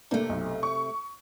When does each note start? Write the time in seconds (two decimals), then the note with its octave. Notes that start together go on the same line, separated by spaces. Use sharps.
0.11 C3 A3 A#3 D4
0.29 B1
0.63 C#6